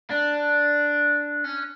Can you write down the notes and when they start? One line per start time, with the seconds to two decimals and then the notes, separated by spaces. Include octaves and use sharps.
0.10 D4
1.44 C#4